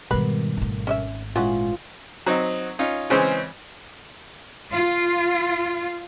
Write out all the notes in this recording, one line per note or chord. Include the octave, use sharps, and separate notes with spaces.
G#2 B2 D#3 G3 A#4 B4
G#1 A3
C#4 D#5 E5
A#2 E3 G#3 C#4 F4 F#4
F#3 C4 D#4
C#4 D#4 F4
C#3 E3 G#3 C4 C#4 C5
F4